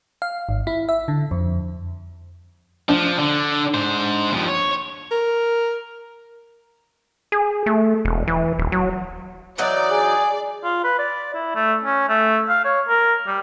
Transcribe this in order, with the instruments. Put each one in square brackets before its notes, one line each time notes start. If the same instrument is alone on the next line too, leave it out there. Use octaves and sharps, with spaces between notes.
[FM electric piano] F5
G#1
E4
E5
D3
F2
[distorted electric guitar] F3 [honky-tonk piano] D4
[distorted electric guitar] D3
G#2 C5
D#2 F3
C#5
[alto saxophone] A#4
[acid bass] G#4
A3
E1
E3
D#1
F#3
[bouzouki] E3 F#3 D#4 [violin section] D5
[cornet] G#4
[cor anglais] F4
B4
D5
E4
A3
C#4
A3
F5
C#5
A#4
G3